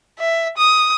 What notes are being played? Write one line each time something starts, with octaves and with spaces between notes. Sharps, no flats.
E5
D#6